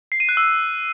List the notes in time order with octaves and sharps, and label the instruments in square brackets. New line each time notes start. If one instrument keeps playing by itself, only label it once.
[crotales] C7
D#7
F#6
E6